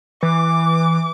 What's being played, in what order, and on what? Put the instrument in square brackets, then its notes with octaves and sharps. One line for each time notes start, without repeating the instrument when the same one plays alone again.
[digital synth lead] E3 [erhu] D6